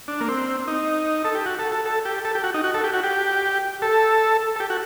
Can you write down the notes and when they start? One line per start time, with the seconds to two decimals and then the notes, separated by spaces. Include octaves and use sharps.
0.08 D4
0.21 A#3
0.29 C4
0.68 D#4
1.25 A4
1.35 G4
1.46 F#4
1.59 A4
1.72 A4
1.85 A4
2.05 G4
2.25 A4
2.35 G4
2.44 F#4
2.54 D#4
2.64 F#4
2.74 A4
2.84 G4
2.93 F#4
3.03 G4
3.82 A4
4.56 A4
4.60 G4
4.70 F#4